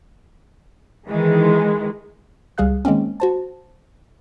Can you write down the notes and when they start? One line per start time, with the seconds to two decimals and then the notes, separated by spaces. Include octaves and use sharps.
1.08 D#3 E3 G#3
2.58 C#2 G3 G#4 F5 F#6
2.85 D#3 G#3 A#3 C4 C#4
3.20 F#4 C5 A5